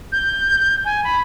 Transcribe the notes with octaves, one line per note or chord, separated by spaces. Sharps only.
G6
G#5
B5